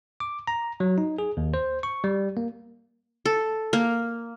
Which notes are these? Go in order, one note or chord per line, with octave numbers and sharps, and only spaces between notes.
D6
A#5
F#3
D#4
G#4
D#2
C5
C#6
G3
A#3
A4
A#3